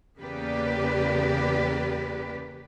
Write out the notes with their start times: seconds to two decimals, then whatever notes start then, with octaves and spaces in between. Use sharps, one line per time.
0.19 E2 C#3 A#3 G4 B4 D5